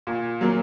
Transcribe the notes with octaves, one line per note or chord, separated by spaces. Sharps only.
A#2
F#3 A#3